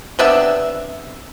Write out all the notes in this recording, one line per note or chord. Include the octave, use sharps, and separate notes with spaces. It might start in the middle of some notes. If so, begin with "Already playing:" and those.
C3 B3 D4 E5